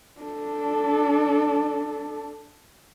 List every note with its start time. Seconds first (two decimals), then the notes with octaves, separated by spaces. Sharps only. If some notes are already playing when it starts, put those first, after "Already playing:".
0.21 D4 A4